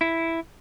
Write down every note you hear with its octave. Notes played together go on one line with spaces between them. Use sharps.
E4